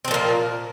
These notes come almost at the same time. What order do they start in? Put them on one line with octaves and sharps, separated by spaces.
C4 F3 A#2 A#3